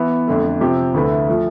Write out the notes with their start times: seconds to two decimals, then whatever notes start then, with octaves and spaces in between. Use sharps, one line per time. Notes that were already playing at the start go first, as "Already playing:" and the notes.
Already playing: E3 B3 E4 B4
0.27 F2 D3 A3
0.61 C3 F3 C4 G4
0.94 D2 D3 A3 E4 B4
1.28 F3 A3